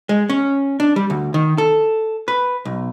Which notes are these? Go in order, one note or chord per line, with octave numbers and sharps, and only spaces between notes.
G#3
C#4
D4
G3
D2
D#3
A4
B4
B1